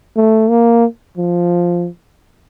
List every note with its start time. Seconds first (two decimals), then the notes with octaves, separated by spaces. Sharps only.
0.16 A3
0.50 A#3
1.17 F3